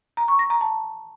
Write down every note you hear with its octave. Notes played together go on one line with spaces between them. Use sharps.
A#5
C#6
A#6
A#5
A5